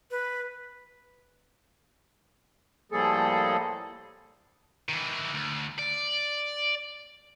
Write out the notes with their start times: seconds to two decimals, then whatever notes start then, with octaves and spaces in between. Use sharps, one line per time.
0.11 B4
2.92 A2 F3 G3 A#3 G#4 A4
4.89 D#3 E3
5.33 D2
5.79 D5